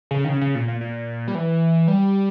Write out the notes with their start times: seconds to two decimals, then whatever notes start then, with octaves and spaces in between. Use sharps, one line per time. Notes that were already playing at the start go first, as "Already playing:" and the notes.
0.11 C#3
0.24 D#3
0.29 C#3
0.41 C#3
0.55 A#2
0.68 A#2
0.81 A#2
1.28 G3
1.35 E3
1.88 G3